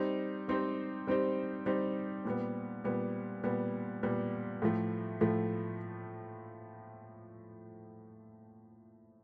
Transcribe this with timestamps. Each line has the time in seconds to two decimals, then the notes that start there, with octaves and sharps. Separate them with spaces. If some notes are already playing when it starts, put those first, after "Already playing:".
Already playing: G3 C4 D#4 G4 C5
0.48 G3 C4 D#4 G4 C5
1.07 G3 C4 D#4 G4 C5
1.66 G3 C4 D#4 G4 C5
2.25 A#2 G3 B3
2.84 A#2 G3 B3
3.44 A#2 G3 B3
4.03 A#2 G3 B3
4.62 A2 F3 A3
5.21 A2 F3 A3